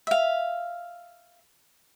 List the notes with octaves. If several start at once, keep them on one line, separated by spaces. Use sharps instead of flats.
E5 F5